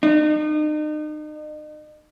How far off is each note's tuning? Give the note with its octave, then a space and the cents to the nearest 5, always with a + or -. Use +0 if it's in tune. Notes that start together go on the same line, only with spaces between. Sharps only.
D#4 -40